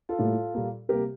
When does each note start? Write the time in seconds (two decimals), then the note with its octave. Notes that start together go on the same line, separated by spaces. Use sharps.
0.09 F4 A4
0.19 A2 G3 A#3
0.54 A#2 G3 A#3
0.89 C3 G3 A#3 G4 A#4